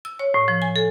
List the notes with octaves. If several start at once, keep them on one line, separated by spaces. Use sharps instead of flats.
E6
C#5
A2
F3
G#5
A4